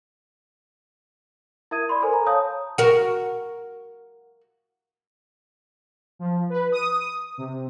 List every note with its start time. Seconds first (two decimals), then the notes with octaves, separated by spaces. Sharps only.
1.71 E4 A#4 E5 D#6 G#6 D#7
1.89 D5 B5 C6
2.02 A4 A#4 C5 G#5
2.13 A#5
2.27 C#5 F5 A5 D#6 G6
2.78 F#4 A#4
6.19 F3
6.50 B4
6.72 D#6
7.38 C3